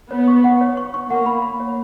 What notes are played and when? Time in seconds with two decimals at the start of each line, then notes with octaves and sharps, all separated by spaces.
0.11 B3 C#5
0.28 C#6
0.44 F#5
0.61 C#5
0.77 C#6
0.94 C#6
1.10 A#3 F#5
1.26 B5
1.42 B5
1.60 C#5